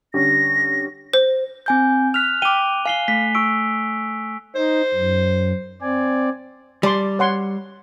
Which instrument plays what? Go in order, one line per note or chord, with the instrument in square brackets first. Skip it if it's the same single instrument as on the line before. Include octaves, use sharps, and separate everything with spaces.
[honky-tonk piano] D3 G3 C#4 [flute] A#6
[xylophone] C5
[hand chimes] C4 G#5 G6
[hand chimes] F6 B6 [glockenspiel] F#6 F7
[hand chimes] G5 D6 [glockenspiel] D#7 G7
[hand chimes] F5 [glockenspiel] G#5 C7 G7
[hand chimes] A3 [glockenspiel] B6
[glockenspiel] C#6 E6 D7
[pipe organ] D#4 [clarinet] C5
[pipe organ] F#2
[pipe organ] C4 D5 [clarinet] G#5
[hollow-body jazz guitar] G3 [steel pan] D5 C6
[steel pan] C#5 F#5 C6